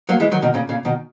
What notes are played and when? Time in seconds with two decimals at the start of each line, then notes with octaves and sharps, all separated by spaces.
0.09 F#3 A#3
0.20 E3 G#3
0.31 D#3 F#3
0.42 B2 D#3
0.54 A#2 C#3
0.69 A#2 C#3
0.85 B2 D#3